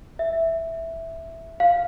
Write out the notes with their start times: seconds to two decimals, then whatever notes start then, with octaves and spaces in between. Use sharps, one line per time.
0.19 E5
1.60 F5